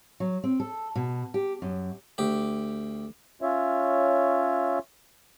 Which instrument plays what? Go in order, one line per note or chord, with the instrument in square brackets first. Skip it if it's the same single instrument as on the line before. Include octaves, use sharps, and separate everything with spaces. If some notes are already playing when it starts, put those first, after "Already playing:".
[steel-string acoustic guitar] F#3
C4
A4
B2
G4
F#2
[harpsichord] D2 G4
[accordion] C#4 F4 C#5 E5